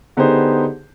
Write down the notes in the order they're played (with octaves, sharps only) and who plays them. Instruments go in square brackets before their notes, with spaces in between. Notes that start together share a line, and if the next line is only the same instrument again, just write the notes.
[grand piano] D3 B3 D#4 G4 G#4 C5